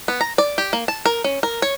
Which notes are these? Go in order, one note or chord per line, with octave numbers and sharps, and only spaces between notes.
B3
A#5
D5
G4
A#3
A5
A#4
C#4
A#4
C#5